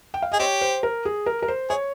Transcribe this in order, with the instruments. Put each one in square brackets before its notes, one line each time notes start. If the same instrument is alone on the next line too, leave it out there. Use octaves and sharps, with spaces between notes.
[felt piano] G5
F5
[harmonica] G#4 [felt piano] D#5
[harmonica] C4 G4 [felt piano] C#5
[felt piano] C5
A#4
G#4
A#4
A#4
C5
[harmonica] G#4 [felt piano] C#5